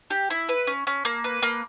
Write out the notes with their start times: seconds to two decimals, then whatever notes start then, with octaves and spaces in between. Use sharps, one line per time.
0.10 G4
0.30 E4
0.49 B4
0.67 C#4
0.87 C#4
1.05 A#3
1.24 B4
1.43 A#3